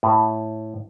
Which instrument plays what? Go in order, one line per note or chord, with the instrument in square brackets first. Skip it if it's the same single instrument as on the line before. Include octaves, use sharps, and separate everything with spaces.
[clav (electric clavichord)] A2